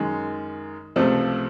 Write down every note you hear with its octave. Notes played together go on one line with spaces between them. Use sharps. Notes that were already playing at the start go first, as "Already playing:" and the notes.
Already playing: F#2 D#3 G#3
C#2 C3 F3 A3 C4